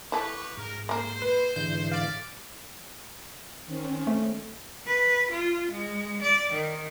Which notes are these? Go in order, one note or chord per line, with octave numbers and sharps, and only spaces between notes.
B3 E4 G4 A4 B4 C#6
G#2 A#4
A#3 A#4 C5
B4
G#2 D3 E3 G6
G4 D5 F5
D#3 C4 C#4
A3
B4
F4
G#3
D5
D#3